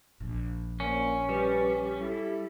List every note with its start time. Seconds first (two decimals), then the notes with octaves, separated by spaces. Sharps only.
0.20 A#1
0.80 A#2 A#3 C#4 C5
1.29 G3 B4
2.00 E4 A4